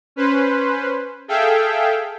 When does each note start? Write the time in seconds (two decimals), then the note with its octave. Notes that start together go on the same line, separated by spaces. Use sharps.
0.16 C#4 B4 C5
1.28 G#4 A4 E5 F5 G5